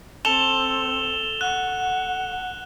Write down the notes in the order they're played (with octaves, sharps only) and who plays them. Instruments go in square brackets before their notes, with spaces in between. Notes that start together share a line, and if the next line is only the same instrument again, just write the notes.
[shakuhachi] C4 [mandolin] A4 [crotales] E7 F7 G7
[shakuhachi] F#5 [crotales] F#6